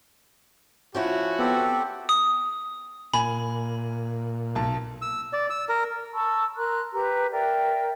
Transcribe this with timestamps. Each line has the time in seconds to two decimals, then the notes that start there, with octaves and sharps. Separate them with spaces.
0.95 F3 C#4 E4 F#4
1.39 B3 C4 G4 A4
2.09 D#6
3.14 A#2 G#5 B5
4.55 B1 A5
5.02 E6
5.33 D5
5.50 E6
5.69 A#4
6.13 A5 B5 C#6 E6
6.56 A#4 A#5 C6 F#6
6.93 G4 B4 A#5
7.32 A#4 D5 E5 G5